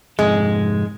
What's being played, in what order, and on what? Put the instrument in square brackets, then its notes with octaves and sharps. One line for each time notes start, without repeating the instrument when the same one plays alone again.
[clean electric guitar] F2 G#2 C3 [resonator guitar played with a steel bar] G#3